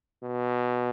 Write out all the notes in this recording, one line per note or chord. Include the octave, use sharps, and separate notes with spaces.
B2